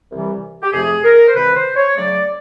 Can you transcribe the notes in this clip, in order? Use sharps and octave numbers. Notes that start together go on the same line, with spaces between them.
C2 C3 E3 G3
G4
F2 C3 F3 A3 G#4
A#4
C5
C2 C3 D#3 B4
C5
C#5
C#3 F#3 A3 D5